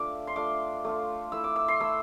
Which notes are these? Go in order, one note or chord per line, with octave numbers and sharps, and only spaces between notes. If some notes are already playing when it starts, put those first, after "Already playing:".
Already playing: A3 D4 F4 D6
C6
A3 D4 F4 D6
A3 D4 F4
A3 E4 E6
D6
E6
C6
A3 E4 E6